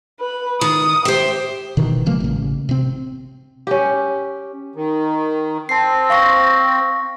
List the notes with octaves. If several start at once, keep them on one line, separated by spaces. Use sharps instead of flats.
B4
D#3 D#6
G4 C5 E5
F#1 B2 D#3 E3
C#3 F3 G#3 A#3
A1 C#3
C3 C4
C#4 G4
D#3
C4 A5 C7
F5 C#6 A#6